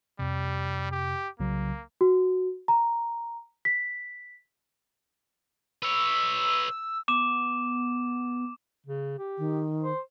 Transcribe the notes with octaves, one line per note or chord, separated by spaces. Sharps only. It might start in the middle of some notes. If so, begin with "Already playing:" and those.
F2 C3 G3
G4
C2 C#3 F#3 A#3
F#4
A#5
B6
B4 C#5 E6
B3 D6 E7
C#3
G4
D#3
C5